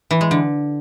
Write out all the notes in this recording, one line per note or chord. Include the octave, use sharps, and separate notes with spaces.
E3
G#3
D3